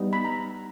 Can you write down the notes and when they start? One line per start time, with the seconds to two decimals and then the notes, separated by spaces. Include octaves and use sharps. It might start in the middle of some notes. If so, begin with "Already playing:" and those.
Already playing: G3 B3 D#4
0.13 B5
0.24 A#5